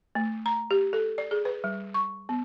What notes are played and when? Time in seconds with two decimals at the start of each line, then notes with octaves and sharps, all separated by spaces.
0.15 A3
0.46 A#5
0.71 G4
0.93 A4
1.18 D5
1.31 G#4
1.45 B4
1.64 G3
1.94 C#6
2.29 B3